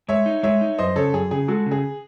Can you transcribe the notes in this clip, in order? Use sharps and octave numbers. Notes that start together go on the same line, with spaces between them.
G#3 C#5 E5
D#4
G#3 C#5 E5
D#4
F#2 C5 D#5
C#3 A4 C#5
F#2 G#4
C#3 G#4
G#3 F#4 A4
C#3
G#4